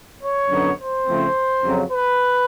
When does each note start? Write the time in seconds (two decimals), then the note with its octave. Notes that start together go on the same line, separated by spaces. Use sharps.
0.22 C#5
0.49 F#2 D3 F#3 B3 D#4
0.78 C5
1.06 C#3 F3 A3 C4
1.63 F2 C#3 F#3
1.91 B4